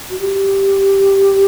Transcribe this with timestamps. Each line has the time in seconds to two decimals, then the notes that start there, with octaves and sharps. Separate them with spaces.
0.10 F#4
0.19 G4